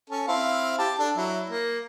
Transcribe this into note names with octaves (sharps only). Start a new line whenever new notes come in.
C#4 A4
C4 E4 F5
G4 A5
D4 A4
F#3 E4
A#3